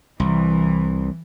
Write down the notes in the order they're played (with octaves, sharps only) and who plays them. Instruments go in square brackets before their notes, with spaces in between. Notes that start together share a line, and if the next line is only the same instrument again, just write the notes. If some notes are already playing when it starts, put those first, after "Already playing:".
[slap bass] C2 [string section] E3